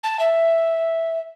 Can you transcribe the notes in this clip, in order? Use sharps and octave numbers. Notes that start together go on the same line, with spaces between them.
A5
E5